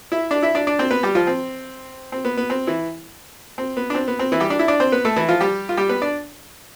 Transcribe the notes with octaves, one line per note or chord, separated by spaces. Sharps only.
E4 E5
D4 D5
E4 E5
D4 D5
D4 D5
C4 C5
B3 B4
G3 G4
F3 F4
C4
C4
B3
B3
C4
E3 E4
C4
B3
D4
C4
B3
C4
E3 E4
G3 G4
D4 D5
E4 E5
D4 D5
C4 C5
B3 B4
A3 A4
E3 E4
F3 F4
G3 G4
F4
G3 G4
B3 B4
D4 D5